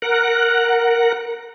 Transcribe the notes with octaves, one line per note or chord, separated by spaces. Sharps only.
A#4 F#5